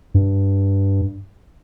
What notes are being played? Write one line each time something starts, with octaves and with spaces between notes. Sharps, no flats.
G2